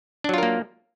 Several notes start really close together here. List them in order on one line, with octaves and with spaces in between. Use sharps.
D4 F#3 F4 A#4 A#3